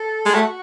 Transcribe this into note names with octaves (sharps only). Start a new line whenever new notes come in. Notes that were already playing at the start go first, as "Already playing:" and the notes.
Already playing: A4
G#3
A3 F#4